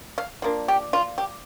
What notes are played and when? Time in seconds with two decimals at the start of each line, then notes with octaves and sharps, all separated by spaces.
0.18 F5
0.42 F3 A#3 D4
0.68 G4
0.93 F4
1.18 G4